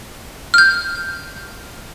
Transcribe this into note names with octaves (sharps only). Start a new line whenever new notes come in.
F6 G6